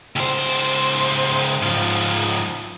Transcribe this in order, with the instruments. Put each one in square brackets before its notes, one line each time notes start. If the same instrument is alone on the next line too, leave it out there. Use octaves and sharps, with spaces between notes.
[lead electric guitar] C#2 C5
G#2 F3